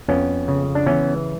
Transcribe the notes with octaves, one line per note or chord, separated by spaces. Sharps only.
F2 B3 C#4
C#3
D4
E3 B3 C#4